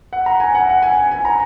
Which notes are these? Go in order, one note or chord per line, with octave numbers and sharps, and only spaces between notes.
F#5
A#5
G#5
F#5
F#5
G#5
G#5
G#5
A#5